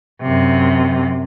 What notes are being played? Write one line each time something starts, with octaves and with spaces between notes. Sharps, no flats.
F#2 C3